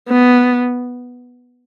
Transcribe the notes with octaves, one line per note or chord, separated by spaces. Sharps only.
B3